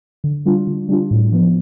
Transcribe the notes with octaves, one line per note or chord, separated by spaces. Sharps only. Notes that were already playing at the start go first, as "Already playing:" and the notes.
D3
G3 D4 F4
D3
G3 D4 F4
A2
F3 B3